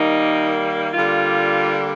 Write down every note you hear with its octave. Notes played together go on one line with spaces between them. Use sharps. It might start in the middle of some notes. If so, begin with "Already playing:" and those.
Already playing: D#3 G3 A#3 D#4
D3 G3 A#3 F4